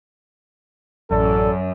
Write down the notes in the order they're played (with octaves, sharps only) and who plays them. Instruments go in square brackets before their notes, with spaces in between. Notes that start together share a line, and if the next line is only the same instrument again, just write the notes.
[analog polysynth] A1 D5 [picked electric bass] F#2 [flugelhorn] A4